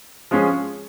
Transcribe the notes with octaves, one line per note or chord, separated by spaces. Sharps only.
F3 G#3 C#4 G#4